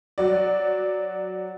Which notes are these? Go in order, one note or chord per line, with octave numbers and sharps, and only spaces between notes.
F#3 F#4 D5